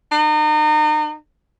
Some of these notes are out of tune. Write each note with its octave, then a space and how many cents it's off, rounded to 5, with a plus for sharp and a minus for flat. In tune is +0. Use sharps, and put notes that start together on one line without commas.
D#4 -35